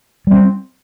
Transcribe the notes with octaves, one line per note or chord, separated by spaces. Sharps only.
G3 C4